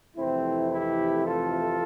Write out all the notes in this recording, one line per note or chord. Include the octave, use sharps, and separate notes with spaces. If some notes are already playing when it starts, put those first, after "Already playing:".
F2 C3 E3 A3 C4 E4
E4 G4
F4 A4